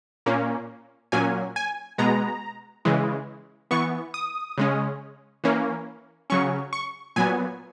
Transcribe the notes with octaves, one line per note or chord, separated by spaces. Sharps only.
A#2 A#3 C#4
A#2 F#3 A#3 C#4 G#5
G#5
B2 G#3 B3 A#5
C#3 E3 G#3
E3 B3 C#6
D#6
C#3 G#3 C#4
E3 A#3 C#4
C#3 F#3 C#4 C#6
C#6
A#2 F#3 B3 G#5